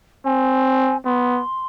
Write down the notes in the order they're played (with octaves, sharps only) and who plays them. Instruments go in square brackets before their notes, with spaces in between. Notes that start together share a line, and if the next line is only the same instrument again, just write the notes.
[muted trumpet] C4 [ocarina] G#5
[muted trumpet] B3 [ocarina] C6